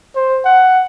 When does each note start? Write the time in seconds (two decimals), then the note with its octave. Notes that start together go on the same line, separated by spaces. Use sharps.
0.16 C5
0.45 F#5